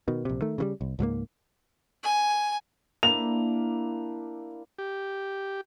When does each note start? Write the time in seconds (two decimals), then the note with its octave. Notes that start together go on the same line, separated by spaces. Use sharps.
0.08 B2 D#3
0.25 A#1 C3
0.41 D#3 A3
0.58 C#3 E3 G3
0.81 C2
0.99 C#2 G#2 F#3 A#3
2.03 G#5
3.03 A#3 D4 E4 F7
4.79 G4